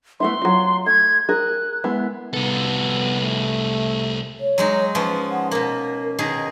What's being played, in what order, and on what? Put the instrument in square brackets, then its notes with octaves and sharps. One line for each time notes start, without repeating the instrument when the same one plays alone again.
[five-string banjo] A3 B3 E4 [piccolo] C6
[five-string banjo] F#3 F4
[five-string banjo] A3 [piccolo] G#6
[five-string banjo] G#4 A#4 [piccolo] F#6
[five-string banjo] G#3 B3 E4
[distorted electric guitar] C2 A4 [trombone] B3
[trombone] A3
[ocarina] C#5
[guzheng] F#3 G#3 D#4
[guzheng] F3 B3 C#4 [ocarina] B4
[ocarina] F#5
[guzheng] B2 A#3 [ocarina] A#4
[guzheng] B2 D#3 G#4